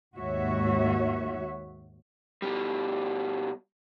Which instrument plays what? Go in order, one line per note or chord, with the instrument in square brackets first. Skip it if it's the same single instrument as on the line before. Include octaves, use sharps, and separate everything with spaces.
[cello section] D#2 G#2 F#4 C#5 E5
[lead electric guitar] B2 G3